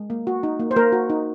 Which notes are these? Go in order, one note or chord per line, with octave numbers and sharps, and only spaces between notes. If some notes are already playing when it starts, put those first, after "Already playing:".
Already playing: G#3
A#3
F#4
D#4
A#3
C5
A#3 A#4
F#4
D#4